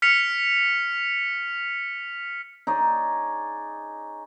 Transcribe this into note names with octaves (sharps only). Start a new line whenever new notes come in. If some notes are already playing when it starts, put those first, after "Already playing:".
F6 B6 C#7 F7
D#4 G#4 C#5 D5